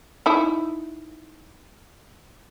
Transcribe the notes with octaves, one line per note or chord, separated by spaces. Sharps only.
D#4 E4